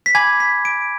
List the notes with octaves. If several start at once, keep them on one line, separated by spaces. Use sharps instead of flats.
B6
G#5 B5 D6 G#6
B6
D7